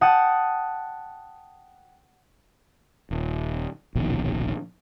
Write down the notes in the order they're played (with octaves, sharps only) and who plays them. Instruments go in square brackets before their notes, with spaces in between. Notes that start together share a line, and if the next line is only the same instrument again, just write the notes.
[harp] F#5 G5 A5 D#6
[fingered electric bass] D#1
D1 A#1 B2 D#3